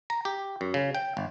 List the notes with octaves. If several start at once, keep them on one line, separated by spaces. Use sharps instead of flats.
A#5
G4
F#2
C#3
G5
G1